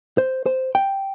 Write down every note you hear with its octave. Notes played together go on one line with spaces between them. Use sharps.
C5
C5
G5